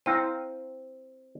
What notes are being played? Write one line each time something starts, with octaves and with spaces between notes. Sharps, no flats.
C4 E4 F5 G5 A#5